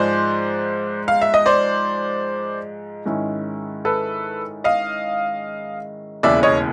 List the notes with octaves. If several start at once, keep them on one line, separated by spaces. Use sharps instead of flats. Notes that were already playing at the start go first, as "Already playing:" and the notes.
Already playing: G#2 F3 G#3 C5 D5
F5
E5
D#5
C5 D5
G#2 D#3 G#3 C#4 E4
A4 B4
D#5 F5
E1 D#2 C#3 E3 D5 E5
C#5 D#5